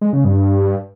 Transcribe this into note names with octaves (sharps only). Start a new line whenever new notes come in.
G#3
C#3
G2